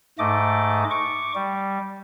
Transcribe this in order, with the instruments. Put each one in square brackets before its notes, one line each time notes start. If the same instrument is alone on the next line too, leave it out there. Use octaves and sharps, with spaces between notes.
[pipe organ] G#2 A3 D#5 D6
C#6 D6
G3